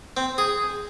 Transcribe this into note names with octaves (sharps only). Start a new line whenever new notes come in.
C4
G#4